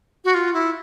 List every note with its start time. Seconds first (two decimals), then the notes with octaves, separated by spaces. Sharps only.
0.25 F#4
0.34 F4
0.54 E4